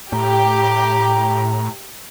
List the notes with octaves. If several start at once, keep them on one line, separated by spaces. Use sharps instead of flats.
A2 G4 A#5